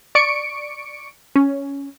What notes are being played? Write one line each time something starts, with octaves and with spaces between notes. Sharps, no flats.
D5 C#6 C#7 D7
C#4